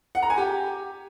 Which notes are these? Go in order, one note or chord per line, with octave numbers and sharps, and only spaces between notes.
F#5
A#5
G#5
G4